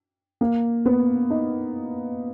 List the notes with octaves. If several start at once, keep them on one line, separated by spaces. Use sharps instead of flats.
A#3
B3
D#4